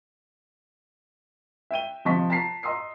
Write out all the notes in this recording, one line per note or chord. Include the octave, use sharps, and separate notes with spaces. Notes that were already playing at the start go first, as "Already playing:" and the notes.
E5 G5 D#7 G7
C3 F3 D#5 A5 C#6 B6
A5 A#5 B6 C7
D#5 A#5 C6 D#6 E6 C7